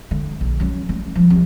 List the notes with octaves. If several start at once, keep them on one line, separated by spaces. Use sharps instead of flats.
D3
A#1
F#3 C#4
G3 A3
F3 F#3
C2